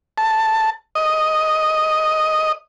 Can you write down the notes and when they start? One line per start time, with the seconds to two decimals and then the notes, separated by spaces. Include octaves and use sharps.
0.18 A5
0.95 D#5